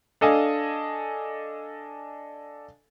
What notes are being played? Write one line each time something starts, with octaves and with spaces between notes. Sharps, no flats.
D4 A4 D#5 F5 G#5